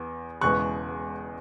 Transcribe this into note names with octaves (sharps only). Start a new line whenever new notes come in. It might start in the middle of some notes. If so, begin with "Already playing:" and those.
Already playing: E2 B3
E1 E2 C#3 G#3 B3 C#6 F#6